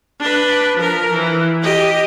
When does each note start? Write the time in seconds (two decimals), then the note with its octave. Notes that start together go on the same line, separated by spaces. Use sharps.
0.21 D4 B4
0.77 F3 A#4
1.12 E3
1.63 G4 D#5